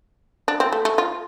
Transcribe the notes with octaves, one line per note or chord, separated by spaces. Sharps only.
D4
C4
A3
A3
F4